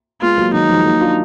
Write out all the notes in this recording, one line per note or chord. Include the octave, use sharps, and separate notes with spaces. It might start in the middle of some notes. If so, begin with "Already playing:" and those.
G#3 B3 F4
F#3 A#3
D#3 F#3 D#4
F3 G#3
F#3 A#3
D4 F4